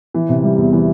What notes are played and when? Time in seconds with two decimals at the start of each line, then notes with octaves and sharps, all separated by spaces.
0.14 E3
0.29 C3
0.44 G3
0.57 E2
0.73 E3